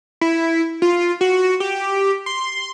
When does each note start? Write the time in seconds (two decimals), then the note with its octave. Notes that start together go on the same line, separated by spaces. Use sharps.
0.21 E4
0.82 F4
1.21 F#4
1.60 G4
2.26 C6